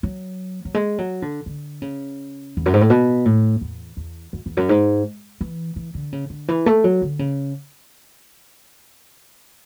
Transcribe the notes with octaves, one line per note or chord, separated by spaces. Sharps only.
F#3
F#3
G#3
F#3
D3
D3
C#3
E2
F#2
G#2
A2
B2
A2
E2
E2
F#2
E2
F#2
G#2
E3
E3
D3
C#3
D3
E3
A3
F#3
D3
C#3